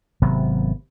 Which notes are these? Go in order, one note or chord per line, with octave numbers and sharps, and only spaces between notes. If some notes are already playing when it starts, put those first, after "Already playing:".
G#1 C3 F#3 B3